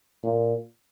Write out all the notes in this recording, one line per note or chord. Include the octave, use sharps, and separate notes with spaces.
A#2